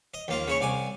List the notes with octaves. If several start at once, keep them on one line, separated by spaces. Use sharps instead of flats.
D#5
D#2 A#3 F4
C#3 E4 C#5
C2 D5 G#5